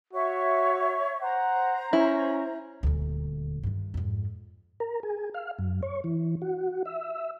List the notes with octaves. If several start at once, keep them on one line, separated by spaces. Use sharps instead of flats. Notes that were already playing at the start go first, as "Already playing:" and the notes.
F#4 C#5 E5 C#6
C5 F#5 A#5
C#4 E4
D#1 D2
G2 D#3
F2 G#2
A#4
G#4
F5
F#2
C#5
E3
F#4
E5